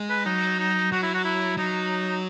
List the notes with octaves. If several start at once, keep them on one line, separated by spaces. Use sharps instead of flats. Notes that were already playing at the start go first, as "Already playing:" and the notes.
Already playing: G#3
B4
F#3 D#4
D#4
F#3 F#4
E4
F#4
E4
F#3 D#4